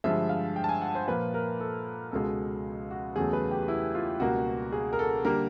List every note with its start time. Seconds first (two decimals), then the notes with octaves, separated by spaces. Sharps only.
0.04 G2 D3 F3 G#3 E5
0.29 F5
0.56 G5
0.64 A5
0.69 G#5
0.81 F#5
0.95 C5
1.08 A#2 F3 A#3 B4
1.34 A#4
1.60 A4
2.11 C#2 B2 G#3 A4
2.91 F#4
3.16 E2 C#3 F#3 A3 G#4
3.33 B4
3.51 G4
3.68 E4
3.95 F4
4.20 C#2 B2 G3 A#3 F#4
4.73 G#4
4.93 A#4
4.99 A4
5.25 D3 G3 A#3 A#4